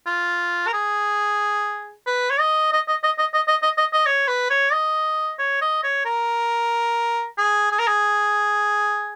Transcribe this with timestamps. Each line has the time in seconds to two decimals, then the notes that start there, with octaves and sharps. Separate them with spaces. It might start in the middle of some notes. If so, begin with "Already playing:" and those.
0.07 F4
0.67 A#4
0.73 G#4
2.06 B4
2.30 C#5
2.40 D#5
2.72 D#5
2.88 D#5
3.03 D#5
3.18 D#5
3.33 D#5
3.48 D#5
3.62 D#5
3.78 D#5
3.93 D#5
4.06 C#5
4.28 B4
4.50 C#5
4.72 D#5
5.39 C#5
5.62 D#5
5.84 C#5
6.05 A#4
7.38 G#4
7.72 G#4
7.79 A#4
7.87 G#4